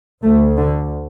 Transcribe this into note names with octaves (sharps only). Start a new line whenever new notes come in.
D2 A3
D3